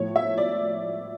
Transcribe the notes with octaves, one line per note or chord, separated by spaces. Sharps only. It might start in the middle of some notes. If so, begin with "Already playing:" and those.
Already playing: A2 F3 C#5
E5
D5